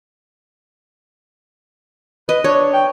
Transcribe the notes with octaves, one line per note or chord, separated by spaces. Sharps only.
B4 D#5
D4 C#5
G5